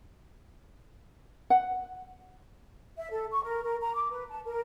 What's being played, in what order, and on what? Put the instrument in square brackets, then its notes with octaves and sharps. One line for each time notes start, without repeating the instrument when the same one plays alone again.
[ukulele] F#5
[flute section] E5
A4
C#6
A#4
A#4
A#5
D6
B4
A5
A#4